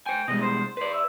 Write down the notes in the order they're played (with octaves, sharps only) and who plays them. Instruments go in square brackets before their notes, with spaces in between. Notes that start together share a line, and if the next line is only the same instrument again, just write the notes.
[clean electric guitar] C5 G#5 [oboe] G5
[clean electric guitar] B2 G3 G#3 [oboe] D#5
[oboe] C5
[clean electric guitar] B4 D5 [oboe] C5
[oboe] E5